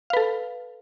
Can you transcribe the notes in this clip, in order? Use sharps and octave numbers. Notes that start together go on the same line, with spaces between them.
A4 B4 F5